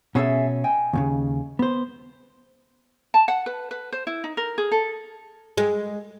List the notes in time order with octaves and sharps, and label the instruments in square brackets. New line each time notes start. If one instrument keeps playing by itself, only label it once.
[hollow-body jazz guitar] B2 C#4 [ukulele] G#4 A4 E5
[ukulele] D#5 G5 G#5
[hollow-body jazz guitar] D#2 A2 C#3
B3 C5
[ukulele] A5
F#5
B4
B4
C5
E4
D#4
A#4
G#4
A4
[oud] G#3